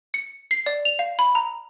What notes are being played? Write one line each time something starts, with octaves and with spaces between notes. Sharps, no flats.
C#7
C7
D5
F7
F5
B5
A#5